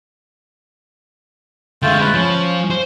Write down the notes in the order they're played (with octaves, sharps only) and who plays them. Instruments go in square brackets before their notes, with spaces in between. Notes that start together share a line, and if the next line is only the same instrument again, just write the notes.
[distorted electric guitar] D3 G#3 [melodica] A3 F4 G5
[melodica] B4
[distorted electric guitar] F3 [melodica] C#4
[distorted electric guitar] C5